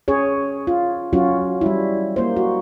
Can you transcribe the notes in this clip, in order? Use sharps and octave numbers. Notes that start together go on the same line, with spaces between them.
C#4 G#4 C#5
F4
F#3 C#4 F4 F#4
G3 E4
A#3 C5
F#4